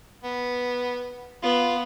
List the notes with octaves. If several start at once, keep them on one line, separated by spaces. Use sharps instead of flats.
B3
B3 F4